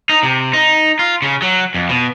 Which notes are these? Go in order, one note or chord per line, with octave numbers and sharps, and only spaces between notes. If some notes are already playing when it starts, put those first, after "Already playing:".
D#4
C3
D#4
F4
C#3
F#3
F2
B2